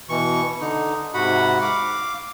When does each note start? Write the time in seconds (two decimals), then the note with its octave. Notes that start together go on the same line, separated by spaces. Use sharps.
0.09 B2 E3 C#6
0.61 D3 D#4
1.14 G#2 C3 F#4 F#5 B5
1.62 F5 D6